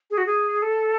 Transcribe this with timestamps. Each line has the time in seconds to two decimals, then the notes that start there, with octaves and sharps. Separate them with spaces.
0.11 G#4
0.18 F#4
0.27 G#4
0.62 A4